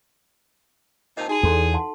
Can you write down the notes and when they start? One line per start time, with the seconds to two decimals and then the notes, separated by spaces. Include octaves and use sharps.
1.17 A#2 C4 D#4 D#5 A5
1.28 D#4 F#4 G#4
1.43 E2 A4 C6
1.74 F#5 A5 C6